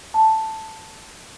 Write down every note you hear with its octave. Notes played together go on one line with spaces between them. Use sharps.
A5